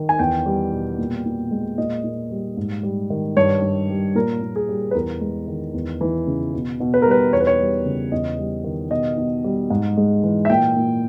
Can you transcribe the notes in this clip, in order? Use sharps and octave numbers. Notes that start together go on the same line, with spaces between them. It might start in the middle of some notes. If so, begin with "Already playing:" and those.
Already playing: D#3
G#5
E2 G5
G3
B2
A#2
A#2
G#3
A#2 D#5
A#2
G3
G#2
G3
D#3
G2 C#5
G2
G3
A#2 A#4
A#2
G#4
G3
B4
E2 A#4
G#3
D#3
E2
E3
C#3
B2
B2
B4
G3 A#4
B4
E2 C#5
B4
C#5
G3
C#3
E2 D#5
G3
D#3
B2 D#5
B2
G3
G#2
G#3
E3
E5
A#2 G5
A#2